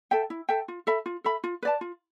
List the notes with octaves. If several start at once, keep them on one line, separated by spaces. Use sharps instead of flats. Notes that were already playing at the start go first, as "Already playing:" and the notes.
A4 E5 G5
E4
A4 E5 G5
F4
A4 E5 B5
F4
A4 E5 B5
F4
B4 D5 A5
F4